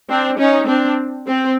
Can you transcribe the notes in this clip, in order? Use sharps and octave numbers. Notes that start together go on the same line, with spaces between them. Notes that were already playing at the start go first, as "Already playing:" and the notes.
C4 D4
C#4 D#4
C4 D4
C4